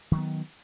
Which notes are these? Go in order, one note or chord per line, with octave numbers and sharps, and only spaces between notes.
D#3 F#3 B3